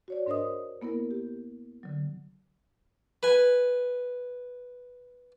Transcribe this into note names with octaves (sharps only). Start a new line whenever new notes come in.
F#4 C#5 D5
G#2 D4 A#4 C5 D#5 D#6
A#3 B3 E4 A#4
G4
D3 F#3
B4 G#5